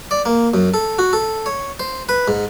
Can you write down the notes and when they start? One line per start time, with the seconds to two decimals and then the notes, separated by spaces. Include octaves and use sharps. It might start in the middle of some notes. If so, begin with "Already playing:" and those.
0.11 D5
0.25 A#3
0.54 F#2
0.74 A4
0.98 F#4
1.13 A4
1.46 C#5
1.80 C5
2.09 B4
2.28 G#2